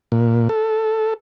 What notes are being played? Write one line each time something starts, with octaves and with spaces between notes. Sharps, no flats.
A#2
A4